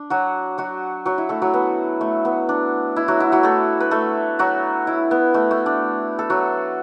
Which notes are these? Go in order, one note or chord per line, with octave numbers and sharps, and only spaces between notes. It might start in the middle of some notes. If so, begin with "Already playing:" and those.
Already playing: D4
F#3 F#4
F#3 F#4
F#3 F#4
E4
A3 A4
F#3 F#4
B3
A3
B3
D4
E4
F#3 F#4
E4
F#3 F#4
A3 A4
B4
A3 A4
F#3 F#4
E4
B3
A3
A3
D4
A4
F#3 F#4